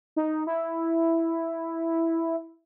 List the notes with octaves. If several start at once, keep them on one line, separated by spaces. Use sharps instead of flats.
D#4
E4